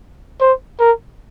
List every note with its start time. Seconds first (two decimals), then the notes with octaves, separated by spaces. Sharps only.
0.40 C5
0.79 A#4